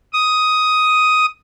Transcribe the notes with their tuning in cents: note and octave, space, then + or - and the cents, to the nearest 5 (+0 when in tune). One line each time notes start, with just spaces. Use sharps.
D#6 +10